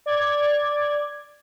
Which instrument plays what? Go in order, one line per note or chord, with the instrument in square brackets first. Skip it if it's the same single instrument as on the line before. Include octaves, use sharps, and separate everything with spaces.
[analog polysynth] D5 G#6